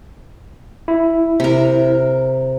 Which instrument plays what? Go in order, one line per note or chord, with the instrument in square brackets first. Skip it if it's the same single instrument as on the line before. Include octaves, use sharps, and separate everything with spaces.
[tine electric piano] E4
[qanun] C3 A#4